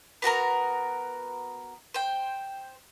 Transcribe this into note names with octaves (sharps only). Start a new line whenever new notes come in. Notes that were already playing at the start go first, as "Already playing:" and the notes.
B3 F#4 A#4 A#5
C5 G5